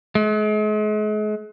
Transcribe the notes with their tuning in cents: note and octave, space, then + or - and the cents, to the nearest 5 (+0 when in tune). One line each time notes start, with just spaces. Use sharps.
G#3 +40